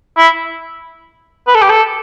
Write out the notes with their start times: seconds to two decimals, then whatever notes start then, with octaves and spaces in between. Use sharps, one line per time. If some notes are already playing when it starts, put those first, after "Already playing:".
0.17 E4
1.47 B4
1.55 A4
1.62 G4
1.70 A4